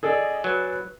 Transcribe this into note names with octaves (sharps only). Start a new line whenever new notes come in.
G#4 A4 D5 D#5
F#3 B4